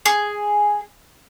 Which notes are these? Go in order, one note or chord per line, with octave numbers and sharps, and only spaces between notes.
G#4